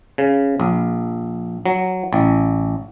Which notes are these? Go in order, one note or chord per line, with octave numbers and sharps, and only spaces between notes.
C#3
A#1
F#3
A1